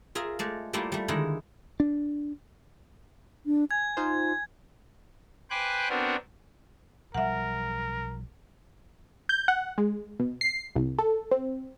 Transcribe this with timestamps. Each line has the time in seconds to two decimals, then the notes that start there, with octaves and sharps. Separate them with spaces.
0.15 F4 G#4 A#4 E5
0.39 G#3 A3 D5
0.73 G3 A3 A#3 E4 F4 G4
0.92 G3 A3
1.08 D3 D#3 G#3 D#4 E4
1.80 D4
3.46 D4
3.71 G#5 G#6
3.97 D#4 F4 C5
5.50 B4 C5 G5 G#5 D6 F#6
5.89 B3 C4 D4 F#4 A#4
7.14 B1 F3 G3 A#4 E5 F#5
9.29 G6
9.48 F#5
9.78 G#3
10.19 B2
10.41 C7
10.76 C2
10.99 A4
11.31 C4